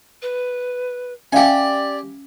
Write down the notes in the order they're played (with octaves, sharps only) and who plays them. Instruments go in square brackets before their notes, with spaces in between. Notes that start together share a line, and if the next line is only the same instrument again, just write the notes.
[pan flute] B4
[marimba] C#4 E5 F5 [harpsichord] G4 G#5 [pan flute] D5